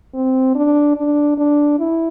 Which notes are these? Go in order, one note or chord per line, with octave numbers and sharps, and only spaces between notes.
C4
D4
D4
D4
E4